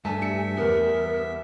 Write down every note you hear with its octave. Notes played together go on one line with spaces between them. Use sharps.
G2 A3 D4 A4 E5 G#5 A5
G3 C#7
E2 G3 B3 A#4